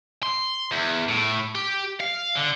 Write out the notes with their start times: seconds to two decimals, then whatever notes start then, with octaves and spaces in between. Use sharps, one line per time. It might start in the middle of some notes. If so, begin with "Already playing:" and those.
0.23 C6
0.71 E2
1.08 A2
1.55 G4
2.00 F5
2.35 D3